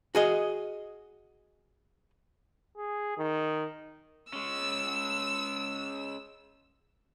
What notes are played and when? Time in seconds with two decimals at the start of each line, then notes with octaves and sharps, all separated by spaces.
0.15 F#4 G#4 D#5
2.77 G#4
3.18 D#3
4.33 G#3 C#4 E6